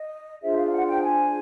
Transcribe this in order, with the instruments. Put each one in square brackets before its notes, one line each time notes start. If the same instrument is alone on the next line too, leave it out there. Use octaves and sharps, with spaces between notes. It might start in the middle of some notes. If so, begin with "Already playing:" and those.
Already playing: [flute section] D#5
D4 F4 G#4 C5 E5
F5
F#5
G5
G#5